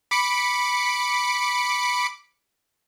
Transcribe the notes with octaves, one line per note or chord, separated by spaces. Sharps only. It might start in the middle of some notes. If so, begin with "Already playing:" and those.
B5 D6 C#7